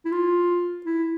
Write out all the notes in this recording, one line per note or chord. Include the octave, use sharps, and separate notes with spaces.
E4
F4
E4